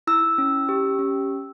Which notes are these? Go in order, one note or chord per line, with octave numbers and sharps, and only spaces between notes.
E4 E6
C#4
G4
C#4